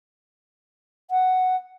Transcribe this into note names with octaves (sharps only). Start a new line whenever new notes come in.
F#5